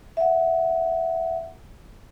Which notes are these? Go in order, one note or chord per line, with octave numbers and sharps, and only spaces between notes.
E5 F#5